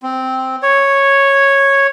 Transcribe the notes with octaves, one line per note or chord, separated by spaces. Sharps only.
C4
C#5